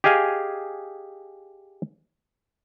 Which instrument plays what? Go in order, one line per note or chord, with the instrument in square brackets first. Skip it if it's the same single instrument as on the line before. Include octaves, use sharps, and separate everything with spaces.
[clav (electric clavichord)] G4 G#4 D#5 F5 G#5